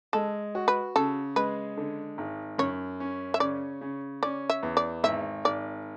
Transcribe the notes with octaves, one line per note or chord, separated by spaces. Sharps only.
G#3 A4
F#4
B4
C#3 A4
G#3 B4
D3
G#1
F#2 C#5
C#4
E5
C#3 D5
C#3
C#4 D5
E5
E2
D5
G#1 E5
G#1 D5